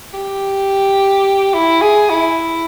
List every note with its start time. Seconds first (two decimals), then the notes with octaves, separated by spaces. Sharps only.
0.14 G4
1.54 E4
1.81 G#4
2.10 E4